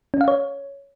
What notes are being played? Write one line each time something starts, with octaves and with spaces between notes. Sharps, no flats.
C#4
F5
C#5